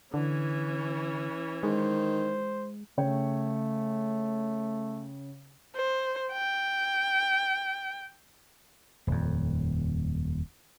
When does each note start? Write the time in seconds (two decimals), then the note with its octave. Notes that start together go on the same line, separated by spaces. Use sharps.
0.14 D3 E3 C#4
1.63 D#3 G#3 C5
2.97 C#3 A3 C#5 G5
5.76 C5
6.33 G5
9.07 D#1 F2